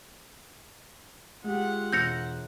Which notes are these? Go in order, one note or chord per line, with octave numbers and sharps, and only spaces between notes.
G#3 F4 G4 F#5
E1 E6 G6 A#6 C#7 F7